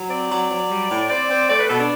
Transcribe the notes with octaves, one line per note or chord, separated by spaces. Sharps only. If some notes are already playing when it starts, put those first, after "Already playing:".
Already playing: F#3
C4 D5
F#3
F#3
G3
A2
C4 D5
C4
A3 D5
B4
B2 A4
D4